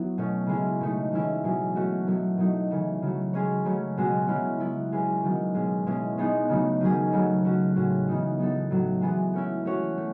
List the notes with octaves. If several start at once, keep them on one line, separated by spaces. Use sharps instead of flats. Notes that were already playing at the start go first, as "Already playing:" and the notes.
Already playing: F#3 B3 E4 C#5
B2 A3 C#4
C#3 G#3 C#4 E4
B2 A3 D#4
E3 G#3 C#4 E4 B4
B2 F#3 C#4 G#4
A3 C#4 F#4
B2 F#3 A3 E4
B2 F#3 A3 D#4
C#3 E3 A3
C#3 F#3 A3
G#3 C#4 G#4 C#5
C#3 F#3 A3 C#4
B2 G#3 C#4 F#4
C#3 G#3 C#4 E4
F#3 B3 E4
G#3 C#4 G#4 B4
D#3 F#3 B3
B2 G#3 C#4
B2 G#3 C#4 E4
B2 G#3 B3 D#4
C#3 F#3 A3 D#4
D#3 F#3 C#4 G#4
C#3 F#3 A3
A3 C#4 F#4
A2 G#3 C#4 F#4
C#3 E3 B3 D#4 F#4
F#3 B3 D#4 A4
A2 F#3 A3
E3 G#3 B3 F#4 B4
A3 C#4 E4
A3 C#4 F#4 C#5
A3